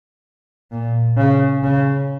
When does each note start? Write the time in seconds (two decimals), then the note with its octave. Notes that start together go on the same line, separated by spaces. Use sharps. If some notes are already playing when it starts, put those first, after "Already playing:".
0.72 A#2
1.17 C#3
1.63 C#3